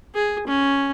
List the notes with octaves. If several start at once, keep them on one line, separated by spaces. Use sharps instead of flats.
G#4
C#4